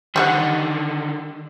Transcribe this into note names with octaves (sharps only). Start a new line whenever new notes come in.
D3 D#3 G3 G#4 F#5